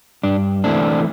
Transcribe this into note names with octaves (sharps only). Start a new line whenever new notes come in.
G2 D4
E3 A3 C4 D4